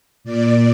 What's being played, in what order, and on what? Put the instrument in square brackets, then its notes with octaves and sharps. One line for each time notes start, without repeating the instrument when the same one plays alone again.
[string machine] A#2 D5